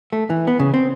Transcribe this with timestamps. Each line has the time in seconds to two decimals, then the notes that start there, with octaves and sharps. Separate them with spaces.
0.13 A3
0.30 E3
0.47 B3
0.60 C#3
0.74 C4